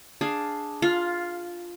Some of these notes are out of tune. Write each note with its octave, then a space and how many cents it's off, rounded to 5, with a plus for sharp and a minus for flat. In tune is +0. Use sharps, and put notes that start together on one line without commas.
D4 +0 G#4 +0 F5 +0
F4 +0 F5 +20